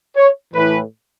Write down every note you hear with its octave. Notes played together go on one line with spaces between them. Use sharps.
C#5
A2 E3 B4